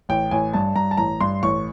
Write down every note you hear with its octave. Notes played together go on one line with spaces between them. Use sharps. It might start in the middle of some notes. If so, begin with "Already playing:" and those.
A1 G5
A1 G#5
G2 A5
G2 A#5
A5
A1 A#5
G2 C6
A1 C#6